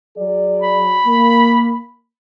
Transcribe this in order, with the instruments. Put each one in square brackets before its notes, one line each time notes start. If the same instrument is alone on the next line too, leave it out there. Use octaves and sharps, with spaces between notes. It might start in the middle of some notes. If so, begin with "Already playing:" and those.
[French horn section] F#3 G#4 D5
[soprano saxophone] B5
[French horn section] A#3